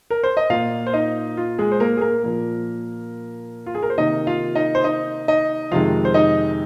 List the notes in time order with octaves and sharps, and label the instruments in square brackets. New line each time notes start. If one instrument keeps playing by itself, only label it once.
[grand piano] A#4
C5
D#5
A#2 A#3 F4 F5
C5
D#4 D#5
F4
G#3 G#4
C5
A#3 A#4
G#4
A#3 A#4
A#2 F3 A#3
F4
G#4
A#4
C5
C3 D#3 A#3 D#4 D#5
F4 F5
D#4 D#5
C5
D#4 D#5
D#4 D#5
F2 C3 D#3 G#3 F4 F5
C5
D#4 D#5